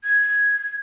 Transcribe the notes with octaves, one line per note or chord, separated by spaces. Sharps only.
G#6